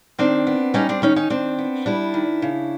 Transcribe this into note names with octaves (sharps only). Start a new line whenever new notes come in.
D#3 C4 D4
B3
G3 C#4 D#4
C4 D4
D#3 C#4 D#4
C#4 D#4
D#3 C4 D4
B3
G3 D4 E4
D#3
C#3